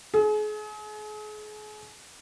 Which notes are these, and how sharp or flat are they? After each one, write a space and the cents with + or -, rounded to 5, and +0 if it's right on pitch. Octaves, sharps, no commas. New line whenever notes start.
G#4 +35